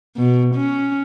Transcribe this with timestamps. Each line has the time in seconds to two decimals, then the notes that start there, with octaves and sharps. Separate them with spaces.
0.17 B2
0.55 C#4